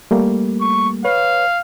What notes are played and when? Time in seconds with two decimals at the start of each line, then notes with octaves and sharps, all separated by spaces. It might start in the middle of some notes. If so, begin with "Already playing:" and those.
0.11 G3 A3 A#3
0.60 C#6
1.05 B4 C#5 F5